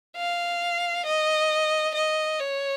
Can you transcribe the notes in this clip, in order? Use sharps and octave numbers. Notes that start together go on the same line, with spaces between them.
F5
D#5
D#5
C#5